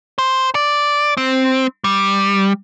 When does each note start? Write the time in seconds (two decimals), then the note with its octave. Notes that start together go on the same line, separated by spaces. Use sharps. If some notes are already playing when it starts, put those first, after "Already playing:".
0.18 C5
0.55 D5
1.17 C4
1.84 G3